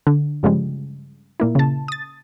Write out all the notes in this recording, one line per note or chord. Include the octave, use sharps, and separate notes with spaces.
D3
G2 C#3 F3 G3 G#3
A#2 A#3 E4
C#3 A5
D#6 A6